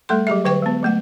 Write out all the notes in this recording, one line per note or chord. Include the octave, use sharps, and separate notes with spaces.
G3 A3 A4 C6
F#3 G4 G#4 E5
D3 F#3 B4 C5 G5 C#6
G#3 B3
F#3 A3 F#5